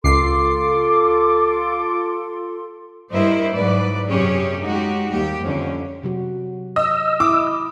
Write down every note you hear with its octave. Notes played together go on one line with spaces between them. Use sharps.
C#2 F4 A4 C6 D6 C7
G2 G3 E4 A#4 C5 D#5
G#2 F#3 B4 D5
F#2 C3 C#4 G4 G#4 C#5
G#3 D#4 F#4 G4
D#2 G3 G4
F2 D3 C#4
C3 F#3 F#4
D#5 E6
E4 D#5 D6